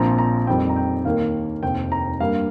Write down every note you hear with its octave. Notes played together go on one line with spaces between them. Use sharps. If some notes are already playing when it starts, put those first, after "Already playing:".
Already playing: A#1 A#2 F3 C4 A#5
A#5
F2 D#3 G3 C4 G5
A#5
G5
D#2 D#3 A#3 F5
F1 D#2 D#3 C4 G5
A#5
G2 G3 A#3 F5